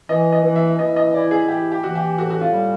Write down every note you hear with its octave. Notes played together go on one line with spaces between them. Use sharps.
E3 D#5
D#5
E3
E5
E3 D#5
D#5
E4 D5
G#4
E3 G4
G4
E3 F#4
G4
A2 F#4
F#4
F4
G3